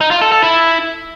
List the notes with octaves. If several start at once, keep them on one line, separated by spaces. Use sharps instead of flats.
D#4
F4
A4
A4
E4